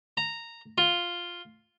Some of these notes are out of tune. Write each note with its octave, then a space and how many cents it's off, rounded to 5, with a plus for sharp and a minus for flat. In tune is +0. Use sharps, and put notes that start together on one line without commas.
A#5 -10
F4 +0